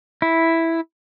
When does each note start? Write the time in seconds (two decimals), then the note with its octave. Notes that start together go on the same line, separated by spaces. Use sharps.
0.22 E4